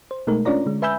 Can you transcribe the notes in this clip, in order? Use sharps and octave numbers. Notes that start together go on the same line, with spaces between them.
C5
B2 G#3 A3 D#4 A#4
C#4 D4 F4 C#5 D5 A#5
D3 G#3
B4 E5 G#5 B5 E6 G6